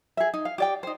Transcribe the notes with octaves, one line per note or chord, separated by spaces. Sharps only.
G#4 E5
D#4
F5
G4 D5 G5
D#4 C5